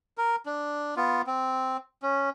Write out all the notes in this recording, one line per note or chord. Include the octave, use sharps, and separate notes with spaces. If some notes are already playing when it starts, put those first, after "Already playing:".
A#4
D4
B3 F4
C4
C#4